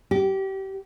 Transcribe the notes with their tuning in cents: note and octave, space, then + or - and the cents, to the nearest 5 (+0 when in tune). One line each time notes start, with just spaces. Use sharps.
G4 -25